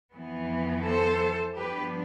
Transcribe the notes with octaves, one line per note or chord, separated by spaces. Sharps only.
F2 E3 B3
A4 C5
G2 F3 B3 D4 G4 B4